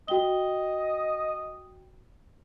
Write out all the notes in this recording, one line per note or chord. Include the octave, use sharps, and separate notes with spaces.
F#4 D#5 G5 G7